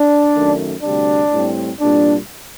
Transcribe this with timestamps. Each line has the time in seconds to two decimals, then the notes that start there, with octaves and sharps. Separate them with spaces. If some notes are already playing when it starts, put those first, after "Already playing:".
Already playing: D4
0.35 F#2 D#3 A3
0.83 D2 C3 G3 D4
1.31 A2 G3 C4
1.80 C2 A#2 G3 D4